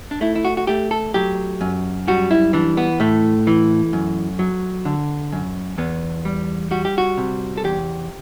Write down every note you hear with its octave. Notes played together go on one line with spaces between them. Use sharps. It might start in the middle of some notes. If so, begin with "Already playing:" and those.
D4
A3 E4
E4
F#4
F#4
A3 G4
A4
F#3 G4
F#2
G3 F#4
E4
E3 D4
B3
A2 A3
E3
F#2
F#3
D3
F#2
E2 B3
G3
G3 F#4
G4
F#4
C3
A4
E2 G4